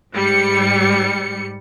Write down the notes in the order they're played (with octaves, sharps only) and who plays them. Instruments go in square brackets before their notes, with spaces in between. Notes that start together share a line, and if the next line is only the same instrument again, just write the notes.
[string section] G#2 G3 C#7